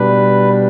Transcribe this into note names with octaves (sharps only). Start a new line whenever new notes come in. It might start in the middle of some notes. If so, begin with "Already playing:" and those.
Already playing: B2 G3 D4 B4